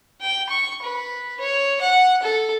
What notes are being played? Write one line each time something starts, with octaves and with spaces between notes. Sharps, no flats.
G5
C#6
B4
C#5
F#5
A4